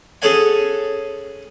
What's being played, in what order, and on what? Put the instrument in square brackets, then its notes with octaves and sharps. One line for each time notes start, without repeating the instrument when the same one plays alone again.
[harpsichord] C#4 G#4 A4 C#5 F#5 G#5